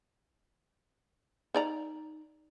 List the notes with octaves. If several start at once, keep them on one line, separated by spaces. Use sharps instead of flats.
D#4 D5 A#5